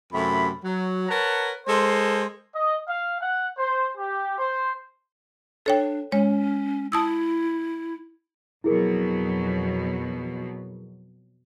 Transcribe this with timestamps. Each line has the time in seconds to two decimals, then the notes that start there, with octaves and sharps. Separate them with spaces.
0.12 F#2 C3 A3 B5
0.63 F#3
1.08 A#4 B4 C#5 F#5 A5 A#5
1.66 G#3 A4 A#4 C5
2.55 D#5
2.88 F5
3.21 F#5
3.57 C5
3.97 G4
4.38 C5
5.66 D4 A4 C#5 G5
6.12 G#3 C#4 C#5
6.92 E4 A5 D#6 E6
8.64 F2 B2 F#3 E4 G#4 A#4